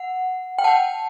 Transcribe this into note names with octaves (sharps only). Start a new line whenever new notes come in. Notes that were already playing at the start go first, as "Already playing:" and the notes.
Already playing: F#5
G5
F#5 A5